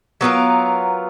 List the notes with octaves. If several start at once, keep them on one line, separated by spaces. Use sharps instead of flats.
F#3 B3 F4 A#4